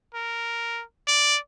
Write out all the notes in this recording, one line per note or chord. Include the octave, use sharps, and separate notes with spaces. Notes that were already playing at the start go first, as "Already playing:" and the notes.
A#4
D5